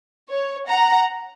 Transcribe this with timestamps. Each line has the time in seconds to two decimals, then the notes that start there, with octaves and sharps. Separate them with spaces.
0.29 C#5
0.67 F#5 A#5